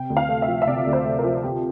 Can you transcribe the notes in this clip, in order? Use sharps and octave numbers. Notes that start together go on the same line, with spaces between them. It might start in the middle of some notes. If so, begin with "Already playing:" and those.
Already playing: C3 G5
D2
F5
A3
E5
F3
E5
C3 D5
D2
C5
A3
A#4
F3
C3 G4